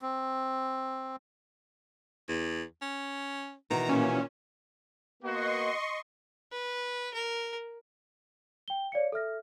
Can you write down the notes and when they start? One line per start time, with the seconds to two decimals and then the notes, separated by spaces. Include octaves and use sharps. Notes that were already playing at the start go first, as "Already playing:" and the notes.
0.02 C4
2.29 E2
2.82 C#4
3.71 B2 D#3 E3 A#5
3.88 A#2 C#4
5.23 A#3 B3 F#4 D#5 C6 C#6
6.52 B4
7.14 A#4
8.68 G5 G7
8.92 C#5 D5 F5 C#7
9.12 A4 E5 F6 A#6